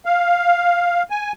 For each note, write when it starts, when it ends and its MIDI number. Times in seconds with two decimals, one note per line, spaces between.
0.06 1.03 77
1.10 1.33 80